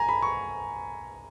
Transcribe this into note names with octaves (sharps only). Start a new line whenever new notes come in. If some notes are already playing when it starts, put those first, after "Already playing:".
Already playing: G#5 A#5
B5
C#6